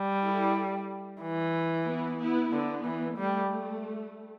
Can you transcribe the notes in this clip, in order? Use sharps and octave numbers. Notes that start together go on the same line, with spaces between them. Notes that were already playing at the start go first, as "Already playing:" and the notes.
Already playing: G3
E4 A4
E3
B3 E4
B3 E4
D3 B3
E3
G3 A3